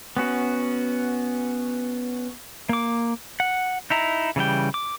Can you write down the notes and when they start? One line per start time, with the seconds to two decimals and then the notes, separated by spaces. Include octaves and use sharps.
0.17 B3 C#4 F#4
2.69 A#3 D6
3.40 F#5
3.90 D#4 E4 A#5
4.36 C#3 E3 G3 G5
4.74 D6